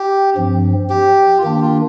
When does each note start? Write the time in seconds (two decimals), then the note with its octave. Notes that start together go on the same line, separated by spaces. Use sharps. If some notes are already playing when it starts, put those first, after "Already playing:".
Already playing: G4
0.36 G2 F3 C4
0.90 G4
1.38 F4
1.43 D#3 A#3 D4 G4
1.62 F4